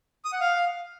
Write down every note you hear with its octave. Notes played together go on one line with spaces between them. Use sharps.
D#6
F#5
F5